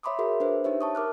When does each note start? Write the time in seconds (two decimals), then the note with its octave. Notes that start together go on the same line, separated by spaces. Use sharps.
0.03 C#5 E5 B5 C6 D6 D#6
0.19 F#4 G#4 A#4 E5
0.40 D4 B4 C5
0.64 D#4 G4 C#5 E5
0.81 A5 C#6 D#6
0.95 A#4 D6 F6 F#6